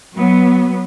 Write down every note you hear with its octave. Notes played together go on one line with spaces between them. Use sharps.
F#3 B3